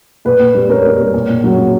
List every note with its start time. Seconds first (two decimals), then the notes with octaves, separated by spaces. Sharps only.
0.25 A#2 B4
0.40 A#2
0.55 G3
0.70 G3 A#4 C#5
0.84 G3
0.99 A#2
1.14 A#2
1.29 A#2
1.44 F#3
1.58 F#3